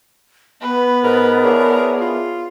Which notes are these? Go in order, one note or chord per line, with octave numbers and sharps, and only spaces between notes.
B3 B4
G#2 A#4
D4 E4 G#4 C#5
F4